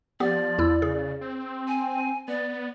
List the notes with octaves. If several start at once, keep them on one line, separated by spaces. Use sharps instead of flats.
F3 B3 G4 D5
E2 E4 E6
C#3 G#4
C4
G#5
B3 D5